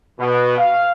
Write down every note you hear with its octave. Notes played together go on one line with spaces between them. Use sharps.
B2
F5